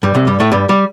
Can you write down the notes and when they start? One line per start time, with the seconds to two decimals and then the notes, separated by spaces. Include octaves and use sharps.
0.03 G2 G3
0.15 C2 C3
0.27 G2 G3
0.40 A2 A3
0.52 G2 G3
0.69 G3